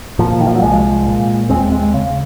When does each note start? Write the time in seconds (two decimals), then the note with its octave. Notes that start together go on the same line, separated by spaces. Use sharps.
0.19 A#2 F3
0.41 D#3
0.47 F3
0.55 F#3
0.62 C2 F3 G#3
1.06 A#2
1.50 D#2 G#3 C4
1.72 G#3 C4
1.94 C#3